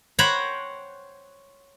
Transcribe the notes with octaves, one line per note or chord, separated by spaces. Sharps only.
C5 C#5 F#5 G5 A#5 B5